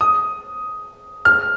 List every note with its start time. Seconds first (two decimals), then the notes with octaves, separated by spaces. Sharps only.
0.01 D#6
1.25 F6